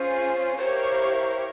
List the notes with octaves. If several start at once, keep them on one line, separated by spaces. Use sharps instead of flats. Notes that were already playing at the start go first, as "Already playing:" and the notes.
Already playing: C#4 F4 G#4 C5
E4 G4 A#4 C5 C#5 F5